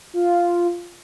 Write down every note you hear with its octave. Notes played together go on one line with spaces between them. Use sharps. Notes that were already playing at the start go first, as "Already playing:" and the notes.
F4